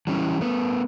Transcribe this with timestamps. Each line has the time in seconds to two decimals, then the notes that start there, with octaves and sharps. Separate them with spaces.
0.07 E3 G3 C#4 E4
0.41 A3 B3